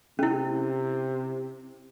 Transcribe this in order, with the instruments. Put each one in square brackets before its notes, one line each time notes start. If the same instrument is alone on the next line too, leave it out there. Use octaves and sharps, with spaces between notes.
[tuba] C3 [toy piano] C#4 E4